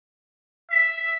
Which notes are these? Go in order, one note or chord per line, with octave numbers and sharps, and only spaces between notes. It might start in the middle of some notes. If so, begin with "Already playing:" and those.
E5 B6